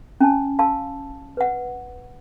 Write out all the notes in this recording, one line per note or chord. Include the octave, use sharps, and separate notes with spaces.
C#4 G#5 A5
F5 A5 C6 E6
B4 F#5